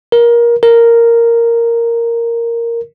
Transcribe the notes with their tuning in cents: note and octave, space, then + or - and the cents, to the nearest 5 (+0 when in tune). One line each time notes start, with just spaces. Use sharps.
A#4 +20
A#4 -5